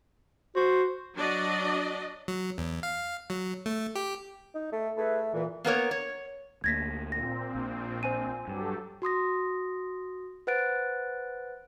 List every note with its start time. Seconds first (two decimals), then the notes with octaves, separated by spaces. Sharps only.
0.56 F#4 C5
1.15 F#3 D4 D5 D#5
2.28 F#3
2.58 E2
2.83 F5
3.30 F#3
3.66 A3
3.95 G4
4.54 D#4
4.72 A3
4.97 A3 E4 G#4 B4
5.34 A#2 E3
5.64 A#3 B3 A#4 C#5
5.91 C#5
6.64 D2 A#3 G#6 A#6 B6
7.12 A#2 C4 A#6
7.55 A#1
8.03 C5 G#5 D#7
8.48 G2 F#3 G4 A4
9.02 F#4 C6 D#6 A#6
10.47 B4 C5 F#5 F#6 A6 D7